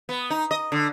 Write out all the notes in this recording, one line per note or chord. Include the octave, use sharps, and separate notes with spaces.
B3
D#4
D#5
D3